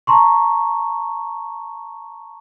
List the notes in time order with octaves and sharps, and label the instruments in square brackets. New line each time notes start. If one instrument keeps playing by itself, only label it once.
[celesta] A5 A#5 C6 C#6